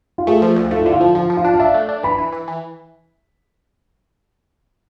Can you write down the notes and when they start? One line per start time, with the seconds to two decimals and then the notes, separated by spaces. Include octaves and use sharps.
0.18 F4
0.27 A3 G#4
0.42 F3
0.56 D2
0.71 A3 F4
0.82 D3 E4
0.92 F4
1.00 F3
1.15 F3 F4
1.30 F3
1.37 F4
1.45 D4
1.54 F5
1.59 D4 E5
1.74 A3
1.89 D4
2.03 E3 B5
2.18 E3
2.32 E3
2.48 E3